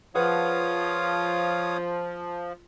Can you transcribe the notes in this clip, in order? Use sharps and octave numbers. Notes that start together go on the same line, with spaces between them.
F3 F4 G#4 B4 C#5 F5 F#5 D#6